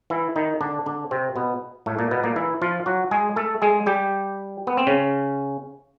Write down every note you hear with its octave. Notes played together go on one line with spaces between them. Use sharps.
E3 E4
D#3 D#4
D3 D4
D3 D4
C3 C4
B2 B3
A2 A3
A#2 A#3
B2 B3
A#2 A#3
E3 E4
F3 F4
F#3 F#4
G#3 G#4
A3 A4
G#3 G#4
G3 G4
B3
C4
C#3 C#4